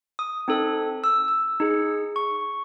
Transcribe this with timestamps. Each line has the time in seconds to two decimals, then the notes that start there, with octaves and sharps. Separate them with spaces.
0.19 D#6
0.48 C4 D#4 A4
1.04 E6
1.28 E6
1.60 D#4 G#4
2.16 C#6